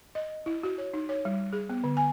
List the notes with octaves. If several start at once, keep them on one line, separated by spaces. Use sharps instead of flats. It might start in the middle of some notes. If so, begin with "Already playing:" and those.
D#5
E4
F#4
C#5
D#4
C#5
G3
G#4
B3
D3
G#5